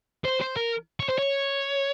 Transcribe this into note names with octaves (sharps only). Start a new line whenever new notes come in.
C5
C5
A#4
C#5
C5
C#5